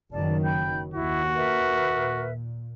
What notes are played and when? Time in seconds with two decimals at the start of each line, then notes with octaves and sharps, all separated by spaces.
0.12 F#1 D#3 F#3 D5 A5
0.44 G5 B5 G6
0.94 D#2 E4 F#4
1.35 A#4 B4 E5
1.88 A#2